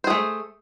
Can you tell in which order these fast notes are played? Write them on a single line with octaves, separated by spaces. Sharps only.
C5 G#4 A3